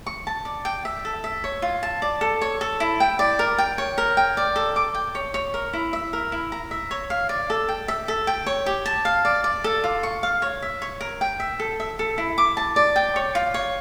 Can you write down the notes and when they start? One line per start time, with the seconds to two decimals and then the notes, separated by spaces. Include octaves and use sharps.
0.06 C#6
0.27 A5
0.45 D5
0.65 G5
0.85 E5
1.05 A4
1.24 E5
1.44 C#5
1.62 F4
1.83 A5
2.02 D5
2.21 A4
2.41 C#5
2.61 A4
2.80 E4
3.00 G5
3.19 D5
3.39 A#4
3.58 G5
3.78 C#5
3.98 A#4
4.17 G5
4.37 D5
4.56 A4
4.76 D6
4.95 G5
5.15 C#5
5.34 C#5
5.54 A#4
5.73 E4
5.93 E5
6.13 A#4
6.32 E4
6.52 A#5
6.71 E5
6.91 C#5
7.10 F5
7.29 D5
7.50 A4
7.68 G5
7.88 E5
8.08 A4
8.27 G5
8.46 C#5
8.66 G4
8.86 A5
9.05 F5
9.25 D5
9.44 D5
9.64 A4
9.84 F4
10.03 C#6
10.23 F5
10.42 C#5
10.62 E5
10.82 C#5
11.01 A#4
11.21 G5
11.40 E5
11.60 A4
11.80 E5
11.99 A4
12.18 E4
12.38 D6
12.57 A5
12.76 D5
12.96 G5
13.16 C#5
13.35 F4
13.54 C#5